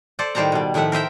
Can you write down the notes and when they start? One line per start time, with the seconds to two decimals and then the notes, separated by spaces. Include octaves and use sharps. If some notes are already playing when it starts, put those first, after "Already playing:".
0.19 A4 C5 D5
0.35 A2 D#3 G3 C5 A5 A#5
0.52 B2 G3
0.74 A2 D#3 F3 E5 F#5
0.92 A#4 C5 E5 G5